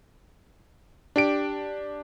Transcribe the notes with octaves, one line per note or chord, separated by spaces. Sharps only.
D4 G4 D7